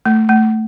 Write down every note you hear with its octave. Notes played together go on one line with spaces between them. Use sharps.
A3
A3